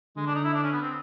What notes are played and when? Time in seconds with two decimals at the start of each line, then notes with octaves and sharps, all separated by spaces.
0.16 D3 G#3
0.26 D4
0.35 D#4
0.44 E4
0.54 D4
0.63 C#4
0.73 B3
0.82 C4